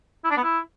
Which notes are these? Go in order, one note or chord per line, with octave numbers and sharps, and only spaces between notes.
E4
D4
B3
E4